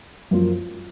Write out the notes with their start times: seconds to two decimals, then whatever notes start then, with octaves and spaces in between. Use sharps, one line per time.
0.31 F#2 F3 A#3 F4